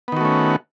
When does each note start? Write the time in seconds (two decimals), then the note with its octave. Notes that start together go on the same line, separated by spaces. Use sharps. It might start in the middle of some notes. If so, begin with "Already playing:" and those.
0.08 B3
0.12 D#3
0.17 F#4
0.21 A3
0.25 C#4